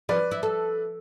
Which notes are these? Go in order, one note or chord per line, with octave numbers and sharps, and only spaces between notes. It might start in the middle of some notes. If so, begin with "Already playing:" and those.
F3 B4 D5
E4
A4